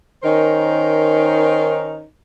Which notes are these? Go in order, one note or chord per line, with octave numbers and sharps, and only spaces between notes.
D#3 C#4 D#4 A#4 C5